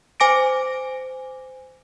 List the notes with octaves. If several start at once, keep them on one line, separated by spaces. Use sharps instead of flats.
C5 G#5 D6 A#6 D7